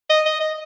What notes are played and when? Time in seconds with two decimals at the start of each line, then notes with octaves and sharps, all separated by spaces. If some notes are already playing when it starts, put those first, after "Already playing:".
0.10 D#5
0.25 D#5
0.40 D#5